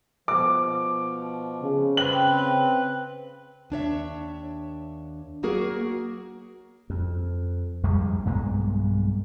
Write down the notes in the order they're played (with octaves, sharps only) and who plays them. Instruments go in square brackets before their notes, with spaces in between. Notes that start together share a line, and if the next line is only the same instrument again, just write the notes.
[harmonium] B2 F3 [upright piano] D6
[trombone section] C#3
[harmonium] C4 B4 [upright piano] F#7
[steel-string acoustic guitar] D#2 D4 C#5 E5
F#3 A#3 F#4 G#4 A#4
[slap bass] F2
A#1 F2 G3 G#3
B1 G2 G#3 A#3